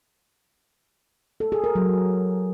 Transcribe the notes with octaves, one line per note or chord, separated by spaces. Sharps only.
A4
G#4
A#4
F#3